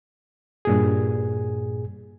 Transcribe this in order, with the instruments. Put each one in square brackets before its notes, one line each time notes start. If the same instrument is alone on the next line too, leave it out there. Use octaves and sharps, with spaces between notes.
[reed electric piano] G2 A#2 G#4